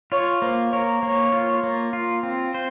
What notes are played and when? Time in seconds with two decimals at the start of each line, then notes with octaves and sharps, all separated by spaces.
0.12 F4 C#5
0.42 A#3 C5
0.72 A#4 C#5
1.03 A#3 C#5
1.32 F4
1.63 A#3
1.93 F4
2.23 C4
2.54 C5